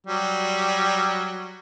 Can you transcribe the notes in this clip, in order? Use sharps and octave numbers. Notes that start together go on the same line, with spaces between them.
F#3 G3